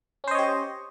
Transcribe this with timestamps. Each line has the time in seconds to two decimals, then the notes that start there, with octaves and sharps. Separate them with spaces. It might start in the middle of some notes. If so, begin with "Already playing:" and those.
0.24 C#4
0.28 C5
0.31 D#5
0.35 C#5
0.39 G4